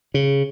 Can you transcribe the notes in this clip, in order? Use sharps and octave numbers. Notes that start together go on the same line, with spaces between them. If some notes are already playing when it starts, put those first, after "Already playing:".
C#3